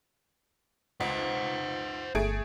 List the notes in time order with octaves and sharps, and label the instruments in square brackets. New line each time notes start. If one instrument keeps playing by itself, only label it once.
[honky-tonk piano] C#2 [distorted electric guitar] C5 F#5
[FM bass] G1 [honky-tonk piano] A3 G#4 D7